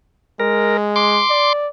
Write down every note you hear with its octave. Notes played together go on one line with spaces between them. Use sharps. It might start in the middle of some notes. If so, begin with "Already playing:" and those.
G#3 A#4
C6 D6
D5